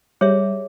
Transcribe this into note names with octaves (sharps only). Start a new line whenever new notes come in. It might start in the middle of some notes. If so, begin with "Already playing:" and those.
G3 G#4 C#5 E5